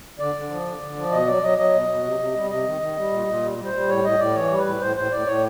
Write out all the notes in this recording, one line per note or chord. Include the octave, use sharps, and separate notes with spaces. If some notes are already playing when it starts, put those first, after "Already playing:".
D3 D5
D3
F3
D3
D3
F3
B2 D#5
F#3 D5
F#3 D#5
F#3 D#5
B2
B2
C3
C3
G3
C3 D#5
D#3
D#3
G3
A#2
A#2
G3
G3
C5
G3
A2 C#5
A2 D#5
A2 D5
E3 C#5
G3
B4
A2
A2 C5
A2 C5
A2 D5
A2 C#5